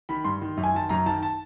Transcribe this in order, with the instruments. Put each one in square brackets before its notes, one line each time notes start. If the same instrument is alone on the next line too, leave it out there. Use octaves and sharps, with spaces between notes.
[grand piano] D#3 B5
G2 C6
D#3
F#2
G#5
D#3 A5
F#2 A#5
D#3 A5
A5